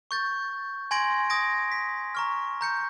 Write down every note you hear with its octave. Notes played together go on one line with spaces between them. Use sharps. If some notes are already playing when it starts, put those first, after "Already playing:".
C#6 G6 A6
G#5 C6 G#6 A#6 D7 F#7
D#6 G#6 A#6 D7
B6
A#5 C#6 F6
A#5 G6 C#7